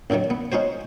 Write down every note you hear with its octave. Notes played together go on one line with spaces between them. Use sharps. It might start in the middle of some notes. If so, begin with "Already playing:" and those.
A1 F#2 D3 D#3 F#3
B3
C#4 D#4 F#4 C5